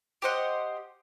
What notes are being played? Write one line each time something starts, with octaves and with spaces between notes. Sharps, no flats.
G4 C5 D#5 F#5